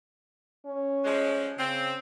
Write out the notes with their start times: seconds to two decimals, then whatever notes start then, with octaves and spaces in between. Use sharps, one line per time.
0.66 C#4
1.04 F3 G3 G#3
1.58 C#3 C4